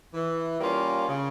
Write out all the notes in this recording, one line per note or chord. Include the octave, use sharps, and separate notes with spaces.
E3
G3 A#3 C#4 F4
C#3